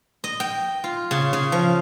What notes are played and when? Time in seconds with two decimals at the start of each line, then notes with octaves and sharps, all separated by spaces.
0.24 D#5
0.40 G5
0.84 F4
1.11 C#3
1.33 C#3
1.52 F3